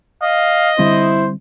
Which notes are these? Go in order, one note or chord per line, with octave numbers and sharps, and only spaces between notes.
D#5 F5
D3 G3 C4 E4 C5